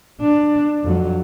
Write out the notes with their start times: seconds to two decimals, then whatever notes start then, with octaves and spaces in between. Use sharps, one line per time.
0.21 D4
0.83 F2 F#3